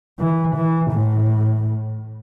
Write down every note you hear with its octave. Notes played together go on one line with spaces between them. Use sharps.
E3
E3
A2